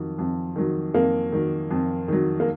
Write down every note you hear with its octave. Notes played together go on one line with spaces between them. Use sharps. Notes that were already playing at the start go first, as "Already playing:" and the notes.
Already playing: F2 D#3 F#3
F2
D#3 F#3
F2 A#3
D#3 F#3
F2
D#3 F#3
A#3